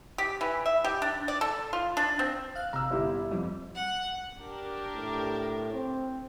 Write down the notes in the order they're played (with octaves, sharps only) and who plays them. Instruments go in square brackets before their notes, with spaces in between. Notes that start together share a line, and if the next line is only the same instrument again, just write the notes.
[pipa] G4
E3
E5
G4
D4
D5
A4
F4
D4
C4
[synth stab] F5 F#6
[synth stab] G#1 C3 F5 [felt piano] A#5 E6
[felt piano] G1 G3 E4
[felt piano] F2 [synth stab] G3
[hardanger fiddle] F#5
[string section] D4 G4 A#4
[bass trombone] A2
C4